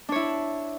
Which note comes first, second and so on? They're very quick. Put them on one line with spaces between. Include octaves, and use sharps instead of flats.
D4 C#5 E4